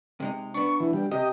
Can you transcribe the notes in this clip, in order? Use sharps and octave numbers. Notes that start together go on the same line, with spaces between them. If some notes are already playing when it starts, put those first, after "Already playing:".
C3 G#3 D#4
B3 D4 C#6
E3
G3
C3 G4 D#5